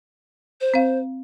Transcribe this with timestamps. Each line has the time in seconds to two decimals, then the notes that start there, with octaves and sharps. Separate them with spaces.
0.61 C5
0.74 C4 F5